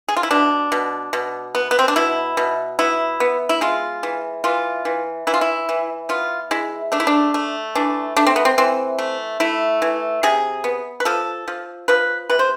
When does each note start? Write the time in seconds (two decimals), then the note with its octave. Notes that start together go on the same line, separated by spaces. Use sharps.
0.08 G#4
0.16 F4
0.23 E4
0.31 B2 D4
0.72 B2
1.13 B2
1.55 B3
1.71 B3
1.79 C4
1.88 D4
1.96 B2 E4
2.37 B2
2.79 B3 E4
3.20 B3
3.49 E4
3.61 G#3 F4
4.03 E3
4.44 E3 F4
4.85 E3
5.27 E3 E4
5.34 F4
5.41 E4
5.69 E3
6.09 B3 F4
6.51 G#3 E4
6.92 A3 D4
7.00 E4
7.07 D4
7.34 A3
7.75 E3 D4
8.16 A3 D4
8.27 C4
8.36 B3
8.45 C4
8.58 E3 C4
8.98 A3
9.40 A3 E4
9.82 E3
10.23 C3 G#4
10.64 B3
11.00 B4
11.05 F3 A4
11.48 F3
11.88 F3 B4
12.30 C3 B4
12.39 C5